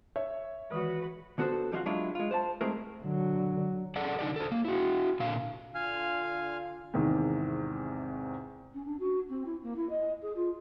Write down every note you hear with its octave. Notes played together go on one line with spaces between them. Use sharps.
C#5 E5
D#3 E3 G#3 F#4 B4
D3 B3 F#4 A4 C5
F3 G3 D4 D#4 F4 F#4
F#3 G#3 D4 E4 F4
G#3 F4
C5 D5 A5
G#3 A3 C4 E4 G#4 A#4
D3 F#3
G#4 A4 D5 F#5
D3 D#4 G4 D5
A4 C5
A#3
E4 F#4
A#2 D3 F5
D3 F4 F5 G#5 F6
E2 G#2 C3 D#3
C#4
D4
F#4
C4
E4
A#3
E4
D#5
G#4
F4